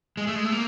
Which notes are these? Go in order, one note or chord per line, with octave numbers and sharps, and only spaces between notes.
G#3
A3
G#3
A3
A#3